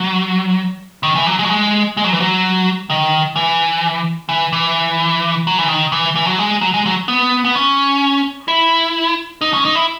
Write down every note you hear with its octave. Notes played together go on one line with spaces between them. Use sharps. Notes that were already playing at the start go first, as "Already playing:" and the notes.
Already playing: F#3
D#3
E3
F#3
G#3
F#3
G#3
G#3
F#3
E3
F#3
D#3
E3
E3
E3
F#3
E3
D#3
E3
E3
F#3
G#3
F#3
G#3
F#3
B3
B3
C#4
E4
D#4
C#4
D#4
E4